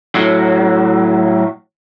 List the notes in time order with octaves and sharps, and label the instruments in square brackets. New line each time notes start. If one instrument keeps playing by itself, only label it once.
[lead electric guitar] A2 F#3